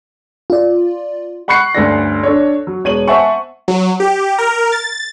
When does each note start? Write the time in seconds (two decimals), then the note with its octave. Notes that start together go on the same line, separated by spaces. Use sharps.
0.50 F4 D5
1.48 F#5 B5 C#6 F#6 C7 C#7
1.75 D2 G2 C#4 A4 D5 A#6
2.23 D4 A4 C#5
2.67 F#3
2.84 E1 C#5 D#7 F#7
3.08 C5 E5 F#5 G#5 A5 C#6
3.68 F#3
4.00 G4
4.38 A#4
4.72 A6